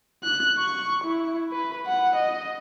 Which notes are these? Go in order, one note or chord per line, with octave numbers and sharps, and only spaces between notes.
F#6
C#6
E4
B4
F#5
D#5